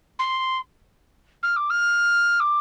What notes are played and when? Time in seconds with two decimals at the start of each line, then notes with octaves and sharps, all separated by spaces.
0.19 C6
1.43 F6
1.56 D6
1.70 F6
2.40 D6